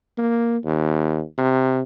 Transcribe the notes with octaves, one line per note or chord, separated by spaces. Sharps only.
A#3
D#2
C3